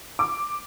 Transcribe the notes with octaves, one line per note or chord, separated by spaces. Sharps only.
D6